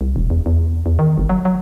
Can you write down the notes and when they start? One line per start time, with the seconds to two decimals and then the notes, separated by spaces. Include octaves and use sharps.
0.01 C2
0.16 E1
0.30 E2
0.46 E2
0.86 E2
0.99 D#3
1.18 G1
1.29 F#3
1.45 F#3